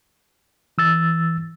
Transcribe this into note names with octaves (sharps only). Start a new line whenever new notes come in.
E3 E6 A6